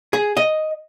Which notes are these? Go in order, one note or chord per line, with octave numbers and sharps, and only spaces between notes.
G#4
D#5